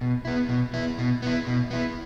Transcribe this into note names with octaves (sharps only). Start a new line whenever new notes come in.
B2
B3 E4
B2
B3 E4
B2
B3 E4
B2
B3 E4